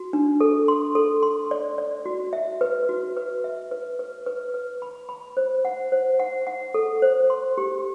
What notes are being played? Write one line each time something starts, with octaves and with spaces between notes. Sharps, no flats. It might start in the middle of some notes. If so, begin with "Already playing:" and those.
Already playing: F#4
D4
A4
C6
A4
C6
D5
D5
F#4
E5
B4
F#4
B4
E5
B4
B4
B4
B4
B5
B5
C5
F#5
C5
F#5
F#5
A4
C5
C6
G4